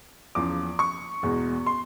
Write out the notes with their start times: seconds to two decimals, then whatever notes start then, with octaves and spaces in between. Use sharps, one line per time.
0.35 E2 C#3 F3 D6
0.79 C#6
1.23 E2 B2 G#3
1.66 C6